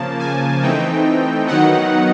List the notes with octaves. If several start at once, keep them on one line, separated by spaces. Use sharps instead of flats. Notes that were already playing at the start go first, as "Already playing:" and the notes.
Already playing: C#3 F3 A#3 A5
G#5
E3 A3 C4 D#4 G5
D#3 F#3 B3 D#4 F#5